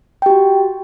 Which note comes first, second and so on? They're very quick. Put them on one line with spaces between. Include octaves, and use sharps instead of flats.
G5 G4 F#4